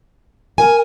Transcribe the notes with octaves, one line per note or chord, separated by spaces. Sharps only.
A#4 G#5